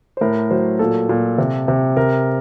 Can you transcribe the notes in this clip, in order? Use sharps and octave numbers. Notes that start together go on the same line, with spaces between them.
C5
A2 A#4
F#3 C5
A#2 A4
A#2
C3
C3
C3 A#4